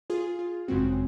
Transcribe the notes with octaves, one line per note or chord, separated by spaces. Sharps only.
F4 G#4
F4
G#1 F#2 C#3 G#3 C4 F#4